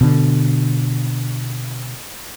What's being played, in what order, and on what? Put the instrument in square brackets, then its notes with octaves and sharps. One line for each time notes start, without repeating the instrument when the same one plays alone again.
[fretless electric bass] B2 D3